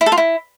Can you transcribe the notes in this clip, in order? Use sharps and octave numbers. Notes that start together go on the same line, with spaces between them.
E4
A4
F4
E4